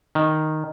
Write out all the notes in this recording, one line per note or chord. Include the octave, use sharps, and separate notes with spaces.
D#3